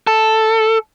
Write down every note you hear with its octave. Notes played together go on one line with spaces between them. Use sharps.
A4